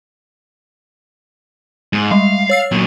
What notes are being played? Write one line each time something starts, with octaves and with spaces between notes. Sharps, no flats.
G#2
G3 G#3 F5
C#5 E6 C7
A#2 F#3